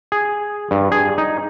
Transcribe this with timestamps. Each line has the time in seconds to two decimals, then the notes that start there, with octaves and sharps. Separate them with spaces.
0.12 G#4
0.71 G2
0.92 G#4
1.18 D#4